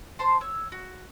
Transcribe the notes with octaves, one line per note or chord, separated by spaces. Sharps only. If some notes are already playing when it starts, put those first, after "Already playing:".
C5 A5 C6
C#5 E6
F#4